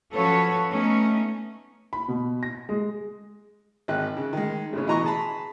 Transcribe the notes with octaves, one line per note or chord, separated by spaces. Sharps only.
F3 C#4 F#4 A4 B4 C#5
A3 B3 C#4 D#4
B5
B2
A#6
G#3
G#1 D#3 F#6
C#3
D#3 G#3
A1 C#3 C#4
B2 E3 D#5 A#5 C6 C#6
G#4 A5 B5